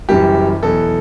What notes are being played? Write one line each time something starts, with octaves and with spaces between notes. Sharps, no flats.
F#1 F#2 E3 G3 G4
E2 B2 F#3 A4